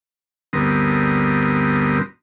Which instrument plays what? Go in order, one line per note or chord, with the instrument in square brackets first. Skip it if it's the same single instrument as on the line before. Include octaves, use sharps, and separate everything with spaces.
[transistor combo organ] D2 G2 B3 C4 A#4 D#6